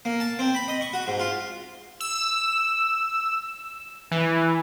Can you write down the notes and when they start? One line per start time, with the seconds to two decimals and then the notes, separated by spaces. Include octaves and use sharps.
0.05 A#3
0.20 A5
0.39 C4
0.55 B5
0.68 D#5
0.81 C#6
0.93 F#4
1.07 G#2
1.20 F4
2.00 E6
4.11 E3